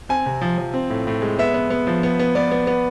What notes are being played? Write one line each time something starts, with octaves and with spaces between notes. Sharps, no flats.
C4 G#5
C3
F3
F3
C4
A2
A2
G#3
B3 E5
B3
B3
F3
B3
B3
B3 D5
B3
B3